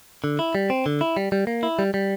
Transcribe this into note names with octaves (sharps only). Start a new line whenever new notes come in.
D3
E4
G3
C4
D3
E4
G3
G3
A#3
E4
G3
G3